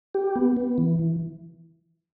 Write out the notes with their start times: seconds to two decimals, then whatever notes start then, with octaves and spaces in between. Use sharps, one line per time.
0.15 G4
0.36 B3
0.57 B3
0.78 E3
0.99 E3